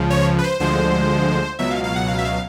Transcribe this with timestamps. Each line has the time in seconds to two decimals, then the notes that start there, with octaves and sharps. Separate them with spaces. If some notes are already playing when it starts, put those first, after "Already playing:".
Already playing: C#2 C#3 F3
0.10 C#5
0.38 B4
0.44 C5
0.60 D2 D3 F3 G#3 C5
1.59 C#2 B2 F#3 E5
1.71 F5
1.84 F5
1.96 F#5
2.08 F5
2.18 E5
2.25 F5